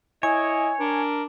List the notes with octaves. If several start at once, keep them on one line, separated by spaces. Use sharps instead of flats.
E4 C#5 D#5 G#5
D4 A#4